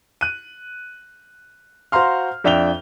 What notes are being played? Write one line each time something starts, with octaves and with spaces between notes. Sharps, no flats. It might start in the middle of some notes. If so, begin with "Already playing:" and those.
F#6 D#7
F#4 C5 F5 A#5 C6 F6
F2 D4 E5 G5 F7 G7